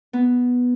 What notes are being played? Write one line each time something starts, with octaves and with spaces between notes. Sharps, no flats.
B3